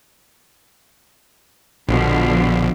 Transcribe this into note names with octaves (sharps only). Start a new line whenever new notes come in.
A#1 B2 D3 F3